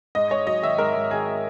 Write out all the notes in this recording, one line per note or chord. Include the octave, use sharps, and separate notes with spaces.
G#2 D#5
G#2 C#5
F#3 D#5
D#3 E5
G#2 A#4
G#2
D#3 G#4